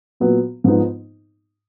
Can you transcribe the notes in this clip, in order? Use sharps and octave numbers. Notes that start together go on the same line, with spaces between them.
A#2 F#3 B3
G#2 F3 B3 D#4